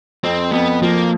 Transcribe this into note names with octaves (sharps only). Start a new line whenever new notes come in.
F2 C4
F2 B3
F3 A#3